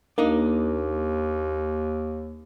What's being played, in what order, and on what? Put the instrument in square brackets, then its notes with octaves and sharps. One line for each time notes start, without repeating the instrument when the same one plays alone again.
[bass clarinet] D#2 [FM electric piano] A#3 [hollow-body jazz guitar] D4 D#4